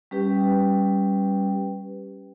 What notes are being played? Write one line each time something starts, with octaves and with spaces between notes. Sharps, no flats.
G3 C#4 G4 B4 G5